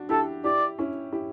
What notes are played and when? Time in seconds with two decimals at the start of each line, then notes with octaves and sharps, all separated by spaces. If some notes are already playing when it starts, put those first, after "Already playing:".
Already playing: D4 F#4
0.09 E4 G4 A4
0.44 E4 G4 D5
0.79 C#4 E4
1.13 E4 G4